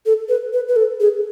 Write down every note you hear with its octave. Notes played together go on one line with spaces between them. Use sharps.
A4
B4
B4
B4
A4
G#4